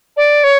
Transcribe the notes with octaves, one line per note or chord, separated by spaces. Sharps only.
D5
C#5